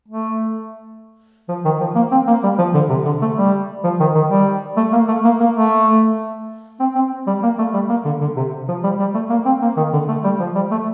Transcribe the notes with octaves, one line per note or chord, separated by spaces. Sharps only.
A3
F3
D#3
F3
A#3
C4
A#3
G3
F3
D3
C3
D3
A3
G3
F3
D#3
D#3
G3
A3
A#3
A3
A#3
A#3
A3
C4
C4
G3
A#3
A3
G3
A#3
D3
D3
C3
F3
G3
G3
A3
A#3
C4
A#3
D#3
D3
A3
G3
F3
G3
A3